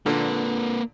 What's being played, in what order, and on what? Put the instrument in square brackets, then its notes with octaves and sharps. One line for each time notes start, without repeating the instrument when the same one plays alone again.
[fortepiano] A#2 D3 [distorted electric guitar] A#3 B4